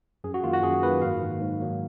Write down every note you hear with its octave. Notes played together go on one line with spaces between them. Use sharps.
F#2 G#4
F#4
D#3 A#3 F4
F#4
F#2 G#4
D#3 A#3 B4
G#2 F5
D#3 F#3 A#3
G#2
D#3 F#3 A#3